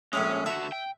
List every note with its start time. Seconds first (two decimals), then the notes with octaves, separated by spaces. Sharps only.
0.13 A#1 A2 G#3 C#4
0.46 D3 F#4 E5
0.72 G5